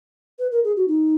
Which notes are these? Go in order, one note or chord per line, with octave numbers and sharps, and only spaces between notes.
B4
A#4
G#4
F#4
D#4